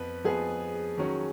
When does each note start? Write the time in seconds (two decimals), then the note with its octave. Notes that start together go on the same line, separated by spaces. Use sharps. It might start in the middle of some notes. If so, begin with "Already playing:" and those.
Already playing: F2 F3 B3 B4
0.24 F2 F3 B3 G#4
0.98 D#3 F#3 C#4 F#4